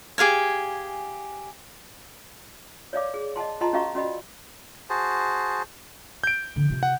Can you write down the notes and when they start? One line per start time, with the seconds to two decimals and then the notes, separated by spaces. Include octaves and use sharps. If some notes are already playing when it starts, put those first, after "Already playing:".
0.18 G4 G#4 F5 G#5
2.93 C#5 D5 F5 D6
3.14 G#4
3.36 D#5 F#5 A5 C6
3.61 F4 D#5 F#5 A5 A#5 C6
3.73 C#4 F#4 D#5 F5 A#5 C#6
3.95 C#4 F#4 D5 D#5 B5
4.90 F#4 G#4 C5 A5
6.24 G6 D7
6.56 D3 F3
6.70 C3 F4
6.83 F#5